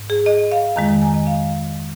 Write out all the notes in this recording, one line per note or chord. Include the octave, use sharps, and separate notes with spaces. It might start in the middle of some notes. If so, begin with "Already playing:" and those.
Already playing: G#2
G#4
D#5
F5
F2 D#3 G#3 A#5
A#5
G#5
D#5
F5